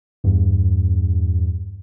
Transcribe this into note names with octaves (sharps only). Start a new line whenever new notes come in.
E2 G2